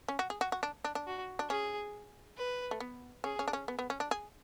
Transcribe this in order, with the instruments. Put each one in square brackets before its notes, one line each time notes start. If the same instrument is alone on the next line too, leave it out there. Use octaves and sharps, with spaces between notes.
[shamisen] C#4
F#4
G#4
F#4
F#4
D4
D4
D4
[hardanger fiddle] F#4
[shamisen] D4
[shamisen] C#4 [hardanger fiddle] G#4
[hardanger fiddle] B4
[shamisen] A3
B3
[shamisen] C#4 [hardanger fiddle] G#4
[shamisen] C#4
D4
C#4
B3
B3
C#4
D4
G#4